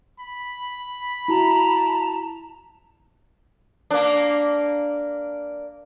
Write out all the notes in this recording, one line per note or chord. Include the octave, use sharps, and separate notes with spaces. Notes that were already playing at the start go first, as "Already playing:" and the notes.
B5
E4 F#4 A5 A#5
A#3 D4